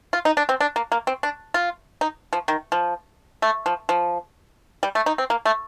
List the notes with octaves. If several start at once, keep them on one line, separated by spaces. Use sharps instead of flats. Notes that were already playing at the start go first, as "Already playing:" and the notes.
F4
D#4
D4
C4
D4
A#3
A#3
C4
D4
F4
D#4
F3
D#3
F3
A3
F3
F3
G3
A3
D#4
C4
A#3
A3